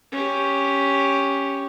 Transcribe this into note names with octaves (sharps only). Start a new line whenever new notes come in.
C#4 G4